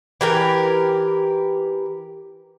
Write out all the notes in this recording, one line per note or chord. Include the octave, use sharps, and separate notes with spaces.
E3 G4 A#4